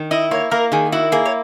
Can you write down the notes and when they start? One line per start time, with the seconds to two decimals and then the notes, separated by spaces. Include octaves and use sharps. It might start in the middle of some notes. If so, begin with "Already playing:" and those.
Already playing: D#3
0.11 E4 D#5
0.31 A#3 C#5
0.51 A#3 A#4
0.72 D#3 G#4
0.92 E4 F#4
1.12 A#3 G#4
1.25 C#5